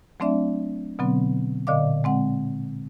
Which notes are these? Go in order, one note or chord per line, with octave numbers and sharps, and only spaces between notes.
F#3 A3 C4 D4 D5 E5
B2 D3 F#3 B3 C4
A#2 D3 D5 D#5 F5 D6
G#3 C4 F#5